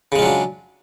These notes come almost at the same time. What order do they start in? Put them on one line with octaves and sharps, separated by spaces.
C#3 G#3 F4 F#3 D4